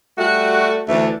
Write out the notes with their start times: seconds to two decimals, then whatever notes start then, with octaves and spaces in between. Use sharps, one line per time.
0.17 G3 A3 F#4
0.88 D2 E3 A3 D4